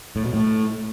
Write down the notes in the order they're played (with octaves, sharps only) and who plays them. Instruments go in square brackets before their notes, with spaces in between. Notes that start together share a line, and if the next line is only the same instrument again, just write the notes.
[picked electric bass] A2
B2
A2